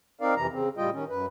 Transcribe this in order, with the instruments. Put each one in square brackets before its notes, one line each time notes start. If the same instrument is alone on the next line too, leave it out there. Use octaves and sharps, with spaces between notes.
[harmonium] C4 D#4 A#4 D5 F5
F2 C3 E3 A#5
C#3 C4
A2 G3 F4 D#5 G5
D#3 C#4
F#2 B4